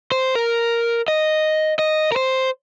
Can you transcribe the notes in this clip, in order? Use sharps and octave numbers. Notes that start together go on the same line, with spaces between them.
C5
A#4
D#5
D#5
A#4
C5